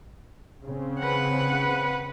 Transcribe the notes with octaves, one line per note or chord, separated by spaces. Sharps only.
C#3 C4
B4 F#5